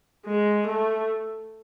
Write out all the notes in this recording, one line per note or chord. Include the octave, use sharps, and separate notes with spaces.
G#3
A3